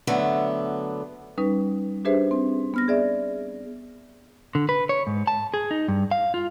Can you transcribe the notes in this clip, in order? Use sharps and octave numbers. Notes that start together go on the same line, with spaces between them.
D3 F#3 A3 B3
G3 C#4 D#4 B4
D4 G4 G#4 B4 C5 E5
C4
B3 F6 A#6
G#4 D5 E5
D3
B4
C#5
G#2
A5
G#4
D#4
G2
F5
F4